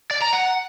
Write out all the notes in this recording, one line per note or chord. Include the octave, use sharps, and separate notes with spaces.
D5
A#5
F#5